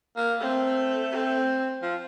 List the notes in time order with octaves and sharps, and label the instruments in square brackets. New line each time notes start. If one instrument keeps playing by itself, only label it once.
[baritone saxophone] A#3
[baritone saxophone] A3 [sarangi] C4
[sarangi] C4
[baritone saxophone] F3